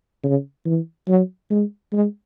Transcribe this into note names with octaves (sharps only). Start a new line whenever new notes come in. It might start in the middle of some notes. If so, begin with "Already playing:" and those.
C#3
E3
F#3
G#3
G#3